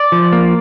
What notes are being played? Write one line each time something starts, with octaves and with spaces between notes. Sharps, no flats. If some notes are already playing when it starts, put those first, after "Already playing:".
Already playing: D5
F3
A#3